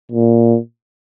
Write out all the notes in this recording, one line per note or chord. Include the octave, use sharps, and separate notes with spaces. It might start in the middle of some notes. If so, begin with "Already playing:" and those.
A#2